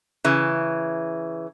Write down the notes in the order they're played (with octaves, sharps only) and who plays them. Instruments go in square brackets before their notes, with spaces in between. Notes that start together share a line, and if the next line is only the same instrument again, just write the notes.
[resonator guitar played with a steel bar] C#3 E3